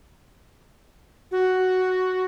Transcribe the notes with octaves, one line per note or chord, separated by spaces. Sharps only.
F#4